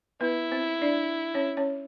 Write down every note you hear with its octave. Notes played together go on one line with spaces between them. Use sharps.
B3 E4 B4
C4 C5
D4 D5
C#4 C#5
C#4 C#5